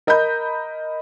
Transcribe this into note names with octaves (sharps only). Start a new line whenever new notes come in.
A#4 D#5 A#5 B5 G6